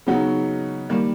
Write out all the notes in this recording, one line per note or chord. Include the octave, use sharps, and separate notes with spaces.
C#3 F#3 B3 D#4 F#4
D#3 G3 A#3